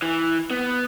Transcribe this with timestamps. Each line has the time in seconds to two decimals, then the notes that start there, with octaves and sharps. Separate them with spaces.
0.02 E3
0.51 B3